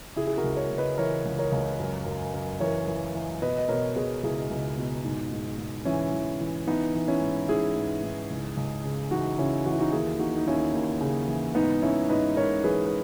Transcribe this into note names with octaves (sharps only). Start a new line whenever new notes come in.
C#3 E4 G#4
G#4
F#4 A#4
C#2
A#4 C#5
C#2
B4 D#5
E3 A#4 C#5
C#2
A#4 C#5
C#2
F#2
F#2
F#2
E3 A#4 C#5
E3
E3
B2 B4 D#5
D#5
B2 A#4 C#5
B2 G#4 B4
C#2 E4 G#4
C#2
B2
G#2
G#2
G#2
E3 C#4 E4
E3
E3
E3 B3 D#4
E3
C#4 E4
G#2
G#2 E4 G#4
G#2
G#2
C#2
C#2
C#3
E3 D#4 F#4
C#3 C#4 E4
E3 F#4
E4
D#4 F#4
D#2 E4 G#4
D#2 D#4 F#4
D#4
D#2 C#4 E4
D#2
C#3
E3
G#2 B3 D#4
E3 C#4 E4
G#2 B4 D#5
G#2 A#4 C#5
E3 G#4 B4
B4